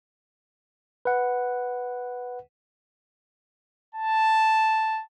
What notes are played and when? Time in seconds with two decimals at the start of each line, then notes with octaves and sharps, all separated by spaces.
1.05 B4 F#5
3.95 A5